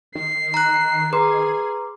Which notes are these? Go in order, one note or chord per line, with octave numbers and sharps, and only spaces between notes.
D#3 C7
A#5 F#6
G#4 B4 A#5 C6 D6